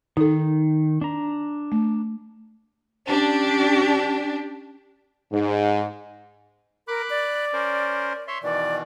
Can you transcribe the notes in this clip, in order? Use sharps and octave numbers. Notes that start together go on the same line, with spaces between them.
D#3 D#4 A4
D4 A#5
A3
C#4 D4 G4
G#2
A#4 B5 D6 F#6
D5
C#4 A#4 C5
C#5 E5 C6
B2 D#3 E3 D5